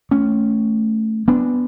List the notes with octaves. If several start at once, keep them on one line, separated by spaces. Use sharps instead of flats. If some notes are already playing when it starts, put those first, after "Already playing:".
A3 C#4
B3 D4